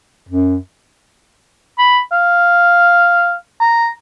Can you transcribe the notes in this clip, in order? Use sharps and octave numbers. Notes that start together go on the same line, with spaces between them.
F#2
B5
F5
A#5